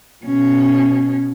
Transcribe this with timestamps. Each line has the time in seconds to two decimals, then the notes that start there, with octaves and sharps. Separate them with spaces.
0.25 B2 C#4